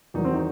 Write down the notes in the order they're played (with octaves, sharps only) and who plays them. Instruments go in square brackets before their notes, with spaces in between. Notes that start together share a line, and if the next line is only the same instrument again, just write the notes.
[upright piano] E2 D#3 F#3 D#4
C4
D#4